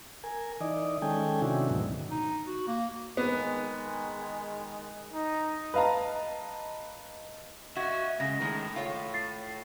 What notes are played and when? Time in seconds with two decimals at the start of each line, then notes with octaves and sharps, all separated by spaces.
0.24 A#4 G#5
0.61 E3 D#4 D5 D#5
1.02 D#3 G#3 C#4 A4 G5 G#5
1.42 C3 D#3 C#4 D4 E4 F#4
1.69 D2 G#2 B2 F#3
2.11 D#4
2.47 F#4
2.68 A#3
3.17 D#3 G#3 B3
5.13 D#4
5.74 B4 D#5 F5 A5 A#5
7.77 F#4 D#5 E5 C#6 G#6
8.20 C#3 G#3 A#6
8.40 A2 D#3 G#3
8.76 F4 C#5
9.14 A6 C7